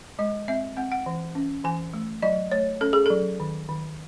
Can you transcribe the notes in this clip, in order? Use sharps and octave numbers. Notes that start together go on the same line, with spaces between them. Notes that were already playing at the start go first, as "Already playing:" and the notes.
G#3 D#5
C4 E5
C4 F#5
F#5
E3
C#4
E3 G#5
A3
F#3 D#5
A3 C#5
C#4 A4
G#4
F#3 A4
D#3
D#3